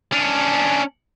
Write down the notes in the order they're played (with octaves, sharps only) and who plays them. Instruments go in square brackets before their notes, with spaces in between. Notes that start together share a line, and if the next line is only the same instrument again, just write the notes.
[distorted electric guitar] C#4 D4